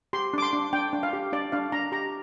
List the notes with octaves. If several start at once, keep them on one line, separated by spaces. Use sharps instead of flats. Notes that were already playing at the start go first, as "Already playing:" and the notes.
G4 C6
D4 D6
C6
D4
D4 G5
D4
F5
G4
D4 D5
D4 F5
D4 A#5
G4 A#5